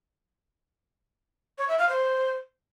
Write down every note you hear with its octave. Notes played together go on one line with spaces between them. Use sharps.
C#5
E5
F5
C5